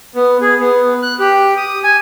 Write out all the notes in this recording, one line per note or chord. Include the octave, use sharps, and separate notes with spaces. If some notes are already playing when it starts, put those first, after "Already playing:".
B3
G#4
B3
F#6
G4
D#6
G#5